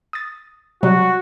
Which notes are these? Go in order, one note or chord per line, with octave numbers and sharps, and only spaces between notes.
D#6 A6
C3 F#3 G3 F#4